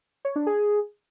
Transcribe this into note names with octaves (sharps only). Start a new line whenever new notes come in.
C#5
D4
G#4